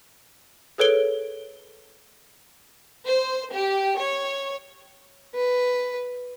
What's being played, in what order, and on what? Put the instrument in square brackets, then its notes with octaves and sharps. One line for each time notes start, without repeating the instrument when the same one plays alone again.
[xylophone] G#4 A4 B4 C#5 D7 G7
[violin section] C5
G4
C#5
[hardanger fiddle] B4